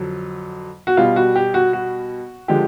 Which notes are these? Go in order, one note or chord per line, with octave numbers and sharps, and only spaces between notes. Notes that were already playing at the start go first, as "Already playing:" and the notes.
Already playing: F2 D3 F#3
F#4
B2 G3 F4
F#4
G4
F#4
F#4
D3 F3 G#3 G4